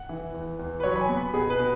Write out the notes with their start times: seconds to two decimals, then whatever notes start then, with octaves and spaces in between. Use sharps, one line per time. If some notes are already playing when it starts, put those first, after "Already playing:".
Already playing: F#5
0.09 E3
0.34 E2
0.59 E2
0.80 B4
0.83 F#3 C#5
0.96 B5
1.01 G#5
1.09 B3
1.17 B5
1.34 B2 G#4
1.50 B4
1.59 B2